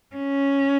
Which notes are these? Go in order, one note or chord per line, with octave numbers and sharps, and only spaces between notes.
C#4